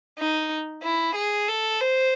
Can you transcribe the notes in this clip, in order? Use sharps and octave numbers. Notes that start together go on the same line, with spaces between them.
D#4
E4
G#4
A4
C5